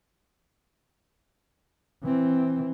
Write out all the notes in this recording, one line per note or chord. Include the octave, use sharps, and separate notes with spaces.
E3 C4